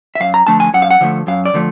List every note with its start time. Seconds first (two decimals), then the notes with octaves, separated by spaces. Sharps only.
0.15 E5
0.20 F#2 F5
0.34 A#5
0.47 D3 F3 A3 A5
0.60 G#5
0.74 F#2 F#5
0.82 F5
0.91 F#5
1.01 D3 F3 A3
1.27 F#2 F5
1.45 D5
1.54 D3 F3 A3